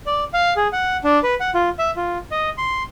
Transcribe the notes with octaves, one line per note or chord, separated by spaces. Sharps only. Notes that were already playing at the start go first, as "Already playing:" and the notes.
D5
F5
G#4
F#5
D4
B4
F#5
F4
E5
F4
D#5
C6